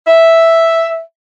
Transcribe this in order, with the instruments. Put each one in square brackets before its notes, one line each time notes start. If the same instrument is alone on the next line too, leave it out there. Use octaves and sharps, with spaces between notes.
[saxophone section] E5